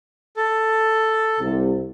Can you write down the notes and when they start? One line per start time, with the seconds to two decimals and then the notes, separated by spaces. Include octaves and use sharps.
0.37 A4
1.39 C2 C3